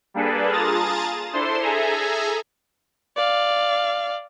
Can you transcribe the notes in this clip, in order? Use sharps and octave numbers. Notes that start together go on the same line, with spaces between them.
G3 A#3 D4 G#4 A4 B4
F4 G#4 A5 A#5 D#6 A6
D4 E4 A4 C5 C6
G#4 A4 E5 G#5 A#5
D5 F5